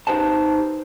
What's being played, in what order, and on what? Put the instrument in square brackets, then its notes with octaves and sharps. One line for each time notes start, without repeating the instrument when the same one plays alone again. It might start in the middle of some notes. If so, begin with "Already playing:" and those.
[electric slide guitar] D#4 G4 B4 C5 A5